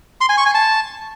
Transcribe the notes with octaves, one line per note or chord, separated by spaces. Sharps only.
C6
G#5
C#6
G#5
A5